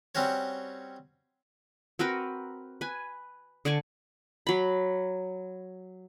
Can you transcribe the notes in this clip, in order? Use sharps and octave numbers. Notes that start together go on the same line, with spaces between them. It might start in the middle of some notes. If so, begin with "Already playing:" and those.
G3 C4 C#4 F#4 C#5
C4 F#4 A#4 B4
B4 G#5
D3 D5 G#5 C#6
F#3 B5